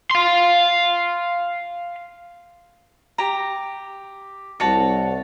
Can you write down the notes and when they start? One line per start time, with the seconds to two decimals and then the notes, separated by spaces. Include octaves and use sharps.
0.11 F5 C6
3.18 G4 A#5
4.60 C2 F#4 C#5 A5